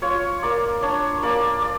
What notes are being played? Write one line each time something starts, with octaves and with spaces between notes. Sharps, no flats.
F4 C#5
A#3 D5
D4 C#5
A#3 D5
D5